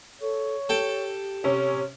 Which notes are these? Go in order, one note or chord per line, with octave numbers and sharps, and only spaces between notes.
A4 C#5
G4 A4 G5
C3 C#4 C#5